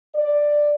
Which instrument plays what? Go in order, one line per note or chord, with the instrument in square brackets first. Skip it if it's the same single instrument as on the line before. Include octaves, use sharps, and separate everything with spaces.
[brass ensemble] D5